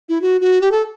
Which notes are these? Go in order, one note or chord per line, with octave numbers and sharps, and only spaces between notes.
E4
F#4
F#4
G4
A4